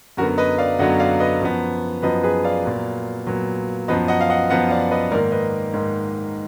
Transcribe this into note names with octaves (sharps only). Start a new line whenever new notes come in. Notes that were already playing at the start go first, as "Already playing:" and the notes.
F#2 D3 F#3 B3 F#4 A#4
B4 D#5
D5 F5
F#2 D3 F#3 B3 D#5 F#5
D5 F5
B4 D#5
F#2 F3 B3
F#2 F3 B3 B4 D#5
G#4 B4
D5 F5
A#2 F#3 B3
A#2 F#3 B3
F#2 F3 B3 B4 D#5
D#5 F#5
F5
D#5 F#5
F#2 F3 B3 D#5 F#5
D5 F5
B4 D#5
G#2 D#3 A#3 A#4 D5
B4 D#5
G#2 D#3 A#3